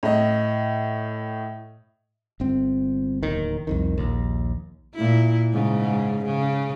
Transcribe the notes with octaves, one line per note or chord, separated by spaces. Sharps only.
A2 D#5
G1 C4
D1 D#2 D#3
C2 F2 D#3
A#1 D#2
A#2 E4
G#2 C#3
C#3